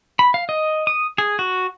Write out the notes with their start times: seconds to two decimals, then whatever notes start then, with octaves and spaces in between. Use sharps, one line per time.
0.19 B5
0.34 F5
0.49 D#5
0.87 D#6
1.18 G#4
1.39 F#4